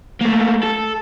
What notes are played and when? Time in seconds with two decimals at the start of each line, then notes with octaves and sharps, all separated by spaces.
0.21 A3 A#3
0.63 A4